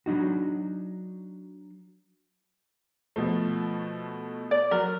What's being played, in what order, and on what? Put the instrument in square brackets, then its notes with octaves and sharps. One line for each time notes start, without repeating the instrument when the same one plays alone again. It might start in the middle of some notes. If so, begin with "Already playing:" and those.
[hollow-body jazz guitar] F#3 D4 D#4 F#4
[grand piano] B2 F3 A3
[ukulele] D5
[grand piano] F#3 [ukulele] A#4